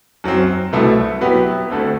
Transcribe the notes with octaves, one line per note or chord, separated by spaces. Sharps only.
F#2 F#3 C4
C2 B2 A3 E4
F#3 B3 E4 G4
D2 D3 A3 C4